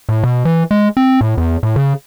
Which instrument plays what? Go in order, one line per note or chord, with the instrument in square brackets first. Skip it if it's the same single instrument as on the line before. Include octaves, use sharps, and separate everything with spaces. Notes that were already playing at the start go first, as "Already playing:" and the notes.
[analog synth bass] A2
B2
E3
G#3
C4
A2
E2
A2
C#3